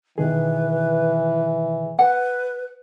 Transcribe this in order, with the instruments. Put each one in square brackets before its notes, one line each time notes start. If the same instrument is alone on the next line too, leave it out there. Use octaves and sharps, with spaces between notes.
[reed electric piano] B2 D#3 G#4 [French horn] E3 [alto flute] B4
[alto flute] B4 [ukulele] F#5